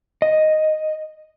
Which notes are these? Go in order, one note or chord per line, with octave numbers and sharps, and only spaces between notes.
D#5